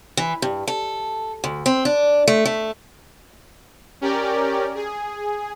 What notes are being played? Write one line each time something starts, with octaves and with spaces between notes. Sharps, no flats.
E3
G2
A4
D2
C4
D4
A3
A3
C#4 G4 A#4 D5
G#4